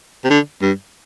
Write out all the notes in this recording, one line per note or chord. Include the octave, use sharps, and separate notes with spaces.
C3
D3
G2